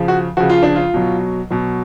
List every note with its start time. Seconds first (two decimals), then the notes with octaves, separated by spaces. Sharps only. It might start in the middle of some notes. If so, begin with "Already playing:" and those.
Already playing: C#3 F3
0.08 F#4
0.37 C#3 F3 F#4
0.49 F4
0.63 D4
0.75 F4
0.94 B2 F#3
1.51 B2 F#3